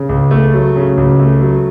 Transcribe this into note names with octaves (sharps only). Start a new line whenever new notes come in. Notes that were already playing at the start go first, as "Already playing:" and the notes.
Already playing: C#3
C#2
A3
F#3
C#3
C#2
A3
F#3